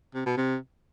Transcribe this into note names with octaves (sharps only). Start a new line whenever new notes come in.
C3
B2
C3